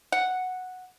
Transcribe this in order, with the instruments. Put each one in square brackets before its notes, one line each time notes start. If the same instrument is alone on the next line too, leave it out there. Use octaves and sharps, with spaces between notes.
[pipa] F#5